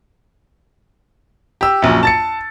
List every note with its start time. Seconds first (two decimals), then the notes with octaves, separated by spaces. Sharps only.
1.61 G4 E6
1.82 A#1 F#2
2.03 A5 A6 C#7